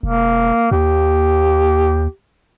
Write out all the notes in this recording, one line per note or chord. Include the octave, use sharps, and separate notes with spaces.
E1 A#3
D#2 G4